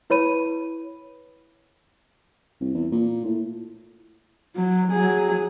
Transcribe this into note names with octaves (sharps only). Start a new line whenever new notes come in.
E4 B4 C#5 B5 D#7
C2
E2
A#2
A2
F#3
F#3 G#4